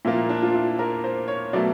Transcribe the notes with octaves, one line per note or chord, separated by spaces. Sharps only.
A#2 F3 A#3 E4
D4
F4
E4
A#4
C5
C#5
B2 F#3 A3 D5